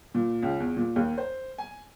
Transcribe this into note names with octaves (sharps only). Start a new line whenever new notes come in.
A#2
C#2
E2
A#2
D#2
C5
G#5